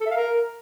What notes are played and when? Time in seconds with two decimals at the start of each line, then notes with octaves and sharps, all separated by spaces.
0.01 A4
0.06 E5
0.11 F5
0.16 A#4